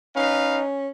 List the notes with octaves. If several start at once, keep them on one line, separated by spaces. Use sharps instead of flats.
C#4 D#4 B4 F5